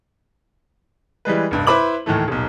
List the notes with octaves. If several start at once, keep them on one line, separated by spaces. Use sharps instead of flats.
E3 G3 G#3 B4
F1 G2
E4 B4 C5 B5 D6 F#7
D#2 A2 D#3 E3 A3
D#1 B1